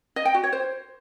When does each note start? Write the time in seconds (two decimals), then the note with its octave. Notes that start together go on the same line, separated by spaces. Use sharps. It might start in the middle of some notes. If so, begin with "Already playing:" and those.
0.16 D#5
0.25 G5
0.34 F#4
0.44 C#5
0.53 C5